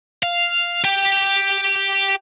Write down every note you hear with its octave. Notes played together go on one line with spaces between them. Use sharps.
F5
G4